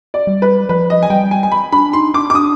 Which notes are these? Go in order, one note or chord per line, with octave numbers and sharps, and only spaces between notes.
D5
G3
B4
F3 B4
D#5
G#5
G3 G5
G#5
G#5
B5
D4 B5
D#4 C6
D4 D6
D6
D4 D#6